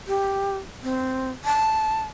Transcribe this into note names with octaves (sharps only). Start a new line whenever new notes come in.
G4
C4
A5